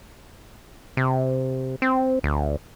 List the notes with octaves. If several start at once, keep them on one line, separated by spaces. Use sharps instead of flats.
C3
C4
D2